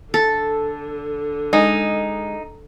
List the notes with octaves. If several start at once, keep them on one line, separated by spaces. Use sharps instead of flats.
D3 A4
G#3 D#4